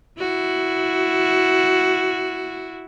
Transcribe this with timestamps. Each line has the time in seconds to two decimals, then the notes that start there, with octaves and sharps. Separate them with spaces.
0.19 E4 F#4